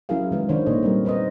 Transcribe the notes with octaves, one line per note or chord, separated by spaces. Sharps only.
F#3 C#4 E4 G#4 A#4 F5
D#3 G#3 B4
D#3 D4 C5 C#5
A#2 A#3 D4 A4 C#5 D#5
G3 C4 A#4
D#4 B4 C5 D#5